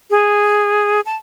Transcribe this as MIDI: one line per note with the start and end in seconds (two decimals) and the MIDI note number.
0.11 1.01 68
1.06 1.16 81